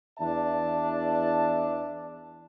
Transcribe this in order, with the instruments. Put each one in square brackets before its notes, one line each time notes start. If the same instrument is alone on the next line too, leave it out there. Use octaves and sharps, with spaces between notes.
[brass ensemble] E2 D4 E5 A5